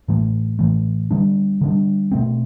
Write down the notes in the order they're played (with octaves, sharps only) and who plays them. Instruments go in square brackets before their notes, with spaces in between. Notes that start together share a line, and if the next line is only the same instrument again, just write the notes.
[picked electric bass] A2 E3 A3
A2 E3 A3
D3 G3 D4
D3 G3 D4
B2 A3 C4